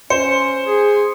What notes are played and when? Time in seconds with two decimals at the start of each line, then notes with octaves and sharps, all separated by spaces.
0.10 C#4 C5 C#7
0.66 G#4